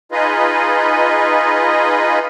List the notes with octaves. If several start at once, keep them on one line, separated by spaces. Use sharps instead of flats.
D#4 F4 G#4 B4 D#5